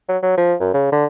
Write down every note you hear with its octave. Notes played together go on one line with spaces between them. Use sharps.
F#3
F#3
F3
F#2
C#3
D3